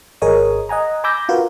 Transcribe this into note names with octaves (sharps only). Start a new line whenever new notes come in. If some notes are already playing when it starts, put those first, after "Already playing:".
G#1 G#4 A#4 C#5 D#5 D#6
D#5 F#5 G#5 A#5
G#5 B5 D6 E6 G6 A#6
F4 F#4 A#4 B4